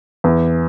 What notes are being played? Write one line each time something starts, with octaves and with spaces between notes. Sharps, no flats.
E2